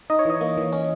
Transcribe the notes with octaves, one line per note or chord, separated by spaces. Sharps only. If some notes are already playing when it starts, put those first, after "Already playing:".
D#4 D#5
C#5
E3 D#5
A#3
E3
C#4